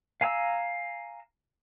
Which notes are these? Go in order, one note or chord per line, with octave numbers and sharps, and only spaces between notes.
F5 G#5 A#5 E6